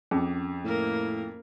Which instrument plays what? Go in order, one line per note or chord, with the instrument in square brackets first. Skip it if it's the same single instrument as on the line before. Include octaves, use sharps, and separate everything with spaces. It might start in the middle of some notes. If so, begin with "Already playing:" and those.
[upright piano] F2 [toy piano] C#4 G#4
[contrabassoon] A2 [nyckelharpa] A#3 A#4